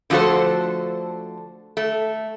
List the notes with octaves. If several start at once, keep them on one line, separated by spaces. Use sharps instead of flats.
D3 F3 A3 F#4 A4 C5
A3